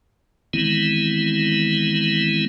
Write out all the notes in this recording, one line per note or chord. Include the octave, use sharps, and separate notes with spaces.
D#3 E3 G#3 B3 C4 E4